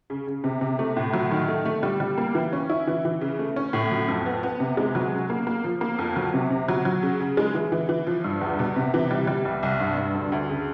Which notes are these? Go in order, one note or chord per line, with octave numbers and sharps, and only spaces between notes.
C#3
C#3
C3
C3
A3
A2
F#3
D#3
A3
A3
G3
G3
A#3
E3
C#4
E4
E3
E3
C#3
A3
C#4
A2
F#3
F2
B3
B3
C3
G#3
F#3
C#3
A#3
A#3
F3
A#3
F2
F#3
C3
C3
F#3
F#3
C#3
C#3
G#3
E3
E3
E3
F3
G2
E2
B2
C3
E3
G3
G3
C2
C2
G2
G2
D2
D2
C#3